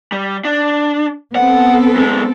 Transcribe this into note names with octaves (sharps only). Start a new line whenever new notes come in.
G3
D4
B3 C4 A4 F#5
F#2 G#3